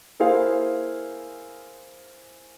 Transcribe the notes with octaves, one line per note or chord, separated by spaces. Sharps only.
A#3 E4 G#4 C5 F5